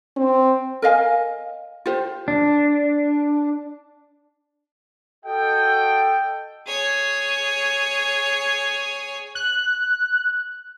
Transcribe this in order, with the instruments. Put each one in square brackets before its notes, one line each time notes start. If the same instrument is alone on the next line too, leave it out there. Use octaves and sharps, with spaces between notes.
[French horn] C4
[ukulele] A#4 D#5 F5 G#5
F4 G4 C5
[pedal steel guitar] D4
[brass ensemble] F#4 A4 D#5 G5
[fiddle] G#4 C#5
[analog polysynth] F#6